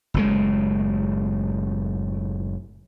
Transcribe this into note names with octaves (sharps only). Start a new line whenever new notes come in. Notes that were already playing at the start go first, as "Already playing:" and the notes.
F#1 A2 G#3